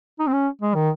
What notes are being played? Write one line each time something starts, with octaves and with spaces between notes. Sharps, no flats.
D#4
C4
C#4
G#3
D#3